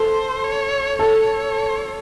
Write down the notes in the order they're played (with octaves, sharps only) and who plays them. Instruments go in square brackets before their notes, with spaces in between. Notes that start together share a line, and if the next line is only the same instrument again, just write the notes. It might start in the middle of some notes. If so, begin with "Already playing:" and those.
Already playing: [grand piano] A4 [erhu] C5
[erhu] C#5
[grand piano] A4 [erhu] C#5